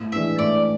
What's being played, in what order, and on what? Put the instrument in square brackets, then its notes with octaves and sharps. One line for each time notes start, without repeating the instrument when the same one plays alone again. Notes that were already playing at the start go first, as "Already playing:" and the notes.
Already playing: [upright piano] A2
[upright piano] E3 G#3 D4 [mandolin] E5
[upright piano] A2 [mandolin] D5